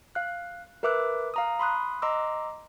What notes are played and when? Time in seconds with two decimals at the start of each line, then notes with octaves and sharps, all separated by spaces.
0.15 F5 F#6
0.83 A#4 B4 E5 D6 E6 F#6
1.34 F5 A#5 D#6
1.59 B5 C6 D#6 F#6
2.02 D#5 A#5 C6 D6 E6